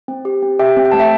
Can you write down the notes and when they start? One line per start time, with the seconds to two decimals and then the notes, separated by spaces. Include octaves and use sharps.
0.08 C4
0.25 G4
0.42 C4
0.59 G4 E5 G5
0.77 C4
0.85 G5
0.92 A3 A5
1.00 E5 G5